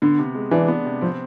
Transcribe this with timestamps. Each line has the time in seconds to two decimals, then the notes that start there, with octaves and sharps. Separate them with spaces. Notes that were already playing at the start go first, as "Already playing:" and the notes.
0.02 D3 B3
0.19 C3
0.34 G#3
0.51 E3 D4
0.68 B3
0.85 C3
1.01 F3 C4